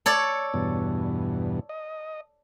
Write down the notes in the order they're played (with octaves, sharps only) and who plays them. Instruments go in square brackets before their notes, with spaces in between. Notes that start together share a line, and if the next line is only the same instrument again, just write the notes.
[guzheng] A4 C#5 D5
[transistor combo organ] E2 G2 B2
D#5